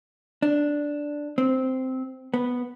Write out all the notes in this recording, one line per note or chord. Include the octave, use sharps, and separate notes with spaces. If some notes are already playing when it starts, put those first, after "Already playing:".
D4
C4
B3